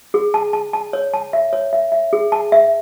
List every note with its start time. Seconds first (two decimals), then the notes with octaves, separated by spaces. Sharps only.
0.14 G#4
0.34 A5
0.53 A5
0.73 A5
0.93 C#5
1.14 A5
1.33 E5
1.53 C#5
1.73 E5
1.92 E5
2.13 G#4
2.32 A5
2.52 E5